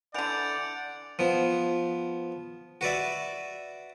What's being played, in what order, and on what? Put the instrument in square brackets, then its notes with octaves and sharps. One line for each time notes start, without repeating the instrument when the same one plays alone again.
[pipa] D3 E3 [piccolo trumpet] D5 [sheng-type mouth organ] F#5 [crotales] G6 D7 F7
[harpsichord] F3 B3
F#4 B4 D5 E5